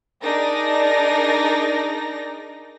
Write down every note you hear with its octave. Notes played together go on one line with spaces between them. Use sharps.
D4 D#4 G#4 A#4 D5 A#6